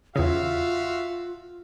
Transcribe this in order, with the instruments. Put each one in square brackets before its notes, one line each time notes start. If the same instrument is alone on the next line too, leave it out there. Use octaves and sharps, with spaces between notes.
[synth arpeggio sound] E2 C#3 [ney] F4 [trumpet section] F#4 E5 F5